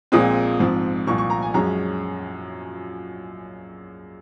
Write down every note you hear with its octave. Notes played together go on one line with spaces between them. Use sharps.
A#1 A#2 G#3 C4 D#6
G#2 F3 C4
C2 A#2 F3 C#6
C#6
A#5
G#5
F#2 F3 G#3 C#4 A#5